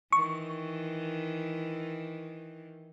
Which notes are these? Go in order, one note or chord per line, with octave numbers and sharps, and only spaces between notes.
D#3 E3 C#6